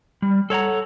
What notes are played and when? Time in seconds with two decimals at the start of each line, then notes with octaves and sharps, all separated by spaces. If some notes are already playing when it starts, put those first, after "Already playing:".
0.22 G3
0.50 A4 C#5 F#5 A#5